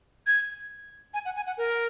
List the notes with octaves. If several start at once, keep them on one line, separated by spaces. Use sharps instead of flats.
G#6
G#5
F#5
G#5
F#5
A#4